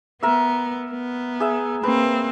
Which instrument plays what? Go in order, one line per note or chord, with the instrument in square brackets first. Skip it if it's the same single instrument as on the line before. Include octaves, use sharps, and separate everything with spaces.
[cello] B3 [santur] A#4 E5
[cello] B3
[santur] G#4 E5
[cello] A#3 C4 [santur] B4